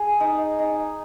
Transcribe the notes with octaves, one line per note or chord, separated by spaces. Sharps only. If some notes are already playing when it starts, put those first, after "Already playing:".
Already playing: G#4
D#4
D#4